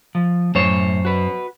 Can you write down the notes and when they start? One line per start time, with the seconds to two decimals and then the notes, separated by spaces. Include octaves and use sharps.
0.15 F3
0.55 F#2 A2 C5 C#5
1.05 F#4 B4